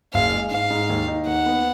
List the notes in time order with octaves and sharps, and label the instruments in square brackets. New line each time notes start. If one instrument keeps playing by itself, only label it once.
[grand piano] F#1 [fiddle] F5
[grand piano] G#3
[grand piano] G#2 [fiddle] F5
[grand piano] G#2
D#2
D#4
[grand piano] D#2 [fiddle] F#5
[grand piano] B3